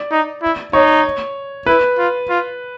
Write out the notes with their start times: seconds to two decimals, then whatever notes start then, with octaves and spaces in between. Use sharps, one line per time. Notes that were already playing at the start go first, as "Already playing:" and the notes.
Already playing: D5
0.12 D#4
0.42 E4
0.73 D#4 C#5
1.66 E4 B4
1.98 F4
2.30 F4